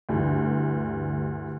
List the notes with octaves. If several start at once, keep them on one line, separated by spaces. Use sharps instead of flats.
D2 G2 D3 E3